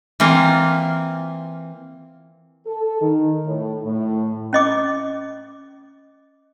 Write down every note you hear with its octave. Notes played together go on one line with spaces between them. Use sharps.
E3 A#3 C4 F4
A4
D#3
A2
A2
C#4 D#5 D6